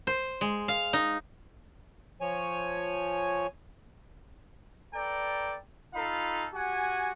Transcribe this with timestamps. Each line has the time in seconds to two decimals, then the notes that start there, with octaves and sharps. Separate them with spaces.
0.07 C5
0.41 G#3
0.68 F5
0.93 D#4
2.21 F3 C#5 G#5
4.95 A4 B4 D5 G5 A#5
5.95 D#4 F4 A4 F5 B5
6.54 F#4 G4 F#5 G#5